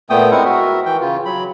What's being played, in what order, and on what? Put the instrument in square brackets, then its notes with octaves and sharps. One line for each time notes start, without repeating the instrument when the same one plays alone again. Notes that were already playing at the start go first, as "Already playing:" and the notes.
[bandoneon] A#2 A3 B3 G5 D#6
G#3 C4 E4 A#4 F#5
F#4 A#4 E5
E3 G5
C#3 F4
F#3 B5